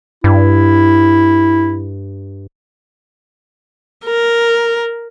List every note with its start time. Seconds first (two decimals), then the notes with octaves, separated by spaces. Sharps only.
0.24 G2 E4
4.05 A#4